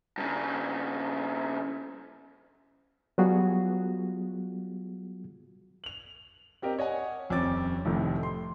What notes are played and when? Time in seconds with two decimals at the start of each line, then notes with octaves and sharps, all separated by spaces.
0.18 G2 C#3
3.18 F#3 G3 B3 F4 F#4 G#4
5.84 F7 F#7
6.62 C4 G4 A#4 D#5
6.78 C#5 D#5 F#5 G#5
7.30 D#1 F2 C4 C#4 D6 A6
7.85 F1 A2 C3 D#3 F3 A3
8.23 C6